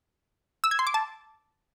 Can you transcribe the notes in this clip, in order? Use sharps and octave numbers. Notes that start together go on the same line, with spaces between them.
E6
G#6
C6
D6
A5